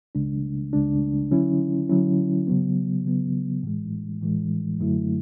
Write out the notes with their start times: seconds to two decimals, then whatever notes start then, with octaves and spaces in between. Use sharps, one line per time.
0.15 C#2 C#3 G#3 D4
0.73 C#2 C#3 G#3 D4
1.31 D3 F#3 C#4 E4
1.89 D3 F#3 C#4 E4
2.47 C#3 F#3 B3
3.05 C#3 F#3 B3
3.63 A2 E3 G#3
4.21 A2 E3 G#3
4.79 F#2 D3 F#3 A3 E4